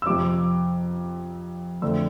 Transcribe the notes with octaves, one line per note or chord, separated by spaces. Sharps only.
E6
F2 C3 F3 C4 D6
F2 D3 A3 C4 E6